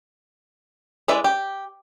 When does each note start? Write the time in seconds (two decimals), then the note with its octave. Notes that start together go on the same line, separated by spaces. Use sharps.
1.08 G#3 E4 B4 D5 E5
1.24 G4